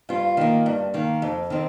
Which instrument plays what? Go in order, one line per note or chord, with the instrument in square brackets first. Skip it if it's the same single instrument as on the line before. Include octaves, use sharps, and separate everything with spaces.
[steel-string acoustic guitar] G2 F4
D#3 A#3
G2
D#3 A#3
F2
D#3 C4